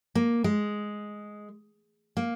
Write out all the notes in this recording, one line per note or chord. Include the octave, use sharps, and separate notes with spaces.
A#3
G#3
A#3